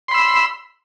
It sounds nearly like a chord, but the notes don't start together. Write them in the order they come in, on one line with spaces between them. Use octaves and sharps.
C6 B5 E6